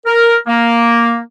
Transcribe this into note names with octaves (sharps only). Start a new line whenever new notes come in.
A#4
A#3